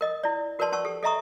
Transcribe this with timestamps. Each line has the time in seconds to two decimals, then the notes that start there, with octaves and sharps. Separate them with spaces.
0.01 A#4 D#5 D#6
0.23 E4 D5
0.59 F#4 A#4 B4 D5 A5 C6
0.72 C#4 A5 C#6 E6
0.85 G4 A4
1.03 A4 D#5 E5 A#5 C#6 D#6